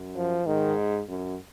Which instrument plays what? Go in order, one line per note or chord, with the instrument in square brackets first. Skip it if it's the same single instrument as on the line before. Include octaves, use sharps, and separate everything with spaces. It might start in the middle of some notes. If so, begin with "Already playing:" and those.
Already playing: [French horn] F#2
[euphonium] F3
[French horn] G#2 [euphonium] D#3
[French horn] F#2